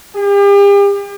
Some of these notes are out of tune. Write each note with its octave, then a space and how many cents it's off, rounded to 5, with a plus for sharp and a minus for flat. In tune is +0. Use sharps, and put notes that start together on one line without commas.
G4 +40